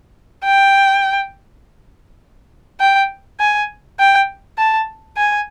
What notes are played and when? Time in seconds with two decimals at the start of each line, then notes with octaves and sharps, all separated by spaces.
0.44 G5
2.80 G5
3.40 G#5
3.99 G5
4.58 A5
5.17 G#5